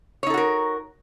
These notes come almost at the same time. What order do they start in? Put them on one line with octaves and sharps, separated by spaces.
C#5 D#4 A4 F#4 A#4